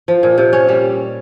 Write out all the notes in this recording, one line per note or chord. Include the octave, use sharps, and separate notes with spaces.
F3
A#2
C3
C#4
G3